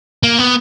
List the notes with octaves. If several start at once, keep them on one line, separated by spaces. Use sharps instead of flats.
A#3
B3